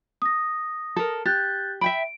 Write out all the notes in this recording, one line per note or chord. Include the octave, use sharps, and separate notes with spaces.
D#6 A#6
A4 A#4
G4 F#6 G6 A6
E5 G5 B5 D7